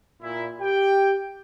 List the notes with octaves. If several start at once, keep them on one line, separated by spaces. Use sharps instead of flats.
A#2 E4
G4 G5